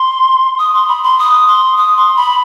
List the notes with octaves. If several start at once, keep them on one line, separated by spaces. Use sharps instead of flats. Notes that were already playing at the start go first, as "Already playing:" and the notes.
Already playing: C6
D#6
C6
B5
C6
D#6
C6
D#6
C6
B5